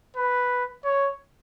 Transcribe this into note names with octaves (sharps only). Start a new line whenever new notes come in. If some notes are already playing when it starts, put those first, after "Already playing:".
B4
C#5